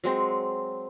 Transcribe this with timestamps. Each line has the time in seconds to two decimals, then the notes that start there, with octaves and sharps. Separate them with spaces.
0.04 F#3 G#3 C4